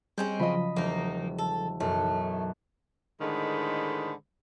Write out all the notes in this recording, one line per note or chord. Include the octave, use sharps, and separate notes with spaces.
G3 G#3 C4 C#4 G6
C#3 F3 F#3 D#5 B5
E1 A#3 D#4
A4
B1 F#2 A3
A2 D3 D#3 G#3 C5 B5